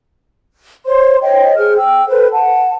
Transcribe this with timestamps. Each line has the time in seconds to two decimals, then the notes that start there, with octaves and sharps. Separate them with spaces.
0.86 C5 C#5 C6
1.22 C5 C#5 D#5 G5
1.56 G#4 C5 F6
1.77 G5 E6
2.08 A4 B4 C5
2.32 F#5 A5